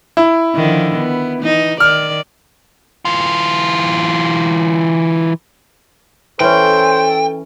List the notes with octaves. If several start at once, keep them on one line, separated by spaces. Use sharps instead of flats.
E4
D3 D#3 F3
B3
E3 D#4
D#3 D5 F6
E3 F4
E3 C#4 A4 C5 G5